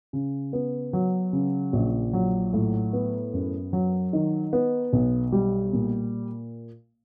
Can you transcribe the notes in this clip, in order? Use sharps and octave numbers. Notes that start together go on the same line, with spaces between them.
C#3
B3
F#3
C#3
A#1
F#3
A2
B3
F#2
F#3
D#3
B3
B1
G3
A#2